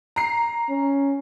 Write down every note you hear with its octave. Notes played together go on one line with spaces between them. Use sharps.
A#5 C7
C#4